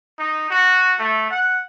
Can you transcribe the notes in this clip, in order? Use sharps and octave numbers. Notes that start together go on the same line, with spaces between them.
D#4
F#4
A3
F#5